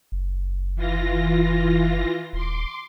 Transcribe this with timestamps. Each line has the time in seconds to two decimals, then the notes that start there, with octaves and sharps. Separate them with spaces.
0.12 F#1
0.76 E3 F4 A#6
2.33 D#1 C6 D6